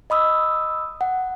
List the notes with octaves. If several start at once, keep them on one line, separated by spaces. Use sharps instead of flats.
D#5 B5 D#6 E6
F#5